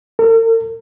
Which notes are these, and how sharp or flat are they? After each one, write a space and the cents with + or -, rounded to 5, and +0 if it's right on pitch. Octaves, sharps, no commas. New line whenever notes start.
A#4 -45